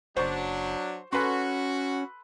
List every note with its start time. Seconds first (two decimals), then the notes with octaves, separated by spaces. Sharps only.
0.17 F#1 F#3 D4 C5 C#6
1.13 C#4 F#4 A4 B4 C6